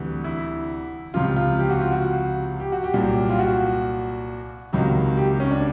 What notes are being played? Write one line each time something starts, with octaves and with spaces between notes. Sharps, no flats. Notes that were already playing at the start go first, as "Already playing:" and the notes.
Already playing: D2 C3 E3 G3
E4
C#2 C3 F3 F4
F4
G4
F#4
F4
F#4
G4
F#4
G4
C2 A#2 F#3
F4
F#4
C#2 C3 D#3 F#3
G4
C#4
D4